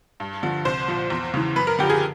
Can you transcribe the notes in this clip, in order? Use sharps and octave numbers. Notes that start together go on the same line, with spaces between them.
G2
D3 F3
C2 C5
A#2 F3
E2
C#3 E3
F#2 B4
A#4
D3 F3 G4
G#4